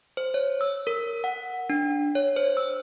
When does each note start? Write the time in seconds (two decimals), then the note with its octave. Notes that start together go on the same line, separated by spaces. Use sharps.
0.17 C5
0.34 C#5
0.61 E6
0.87 A#4
1.24 F#5
1.70 D4
2.15 C#5
2.36 C5
2.57 E6